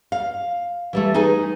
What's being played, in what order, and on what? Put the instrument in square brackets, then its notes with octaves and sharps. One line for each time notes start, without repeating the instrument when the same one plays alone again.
[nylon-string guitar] F5
E3 G3 A3
D#4 G#4 B4 G#5